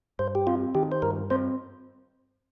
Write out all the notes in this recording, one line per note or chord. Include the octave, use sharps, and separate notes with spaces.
G2 C5
G4
C4 F4
D#3 G4
C5
G2 A#4
C4 C5